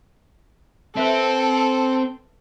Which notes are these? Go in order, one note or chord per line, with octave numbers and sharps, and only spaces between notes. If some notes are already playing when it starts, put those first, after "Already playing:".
C4 A4 B4 E5